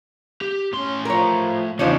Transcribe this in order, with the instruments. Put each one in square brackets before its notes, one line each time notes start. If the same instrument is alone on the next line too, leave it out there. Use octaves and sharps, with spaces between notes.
[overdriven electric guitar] G4
[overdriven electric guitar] A2 C6 [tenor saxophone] C#4
[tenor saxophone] F3 [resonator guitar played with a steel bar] A#4 C#5
[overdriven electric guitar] E2 C#3 [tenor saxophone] F3 [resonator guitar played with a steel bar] D4 D#4 C#5